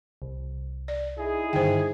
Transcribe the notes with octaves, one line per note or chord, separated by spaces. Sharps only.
C2
D5
D#4 E4 G#4
G2 D3 D#3 C5 G5